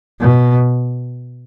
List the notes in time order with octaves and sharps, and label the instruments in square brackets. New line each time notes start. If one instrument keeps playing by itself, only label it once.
[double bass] B2